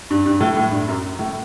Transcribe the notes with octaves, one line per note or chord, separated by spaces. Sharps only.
G2
G2
A2
A2
G2
F#2
A2